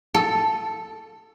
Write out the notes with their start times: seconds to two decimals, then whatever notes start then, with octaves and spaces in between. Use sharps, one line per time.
0.14 A4